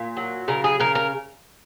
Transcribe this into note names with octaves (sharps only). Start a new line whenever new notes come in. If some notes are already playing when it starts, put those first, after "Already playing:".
Already playing: A#2
F#3
C#3 A#4
G#4
C#3 A#4
A#4